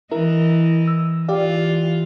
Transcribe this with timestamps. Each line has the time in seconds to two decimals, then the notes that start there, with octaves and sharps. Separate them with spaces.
0.11 E3 E4 A#4 D#5
0.88 E6
1.28 E3 F4 G4 D5 F5